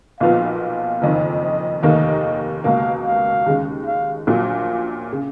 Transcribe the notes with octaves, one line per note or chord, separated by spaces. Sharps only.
B1 A#2 F3 B3 F4 F5
F5
F#1 F2 D#3
D#5
F1 D#2 D#3 A#3 D#5
C#2 B2 A#3 F5
F5
D#2 C#3 G#3
F5
A#1 A#2 F#3 F5
C#3